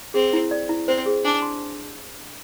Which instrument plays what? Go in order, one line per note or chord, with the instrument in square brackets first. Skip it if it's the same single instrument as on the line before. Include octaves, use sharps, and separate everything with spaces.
[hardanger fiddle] C4 [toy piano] G#4
[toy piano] E4
D5
E4
[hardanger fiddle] C4 [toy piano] C5
[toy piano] G#4
[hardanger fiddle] D4 [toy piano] G#5
[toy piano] C6